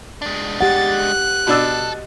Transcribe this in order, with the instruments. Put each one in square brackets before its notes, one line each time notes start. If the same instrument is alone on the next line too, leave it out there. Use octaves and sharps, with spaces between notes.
[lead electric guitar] G#3 D4
[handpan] G4 F#5 [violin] A6
[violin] F#6
[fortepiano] B2 D4 E6 [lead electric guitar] A4